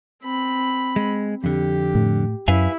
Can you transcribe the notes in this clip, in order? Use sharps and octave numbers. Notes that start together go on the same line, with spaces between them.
C4 B5
G#3
F2 D3 G4
A2
F#2 E4 B4 F5 G#5